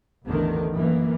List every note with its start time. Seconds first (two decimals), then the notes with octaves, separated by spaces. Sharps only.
0.24 A1 E2 D3 D#3
0.74 F#2 D#3 E3 A#3